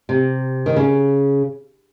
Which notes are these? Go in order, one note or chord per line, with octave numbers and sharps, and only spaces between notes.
C3
D#3
C#3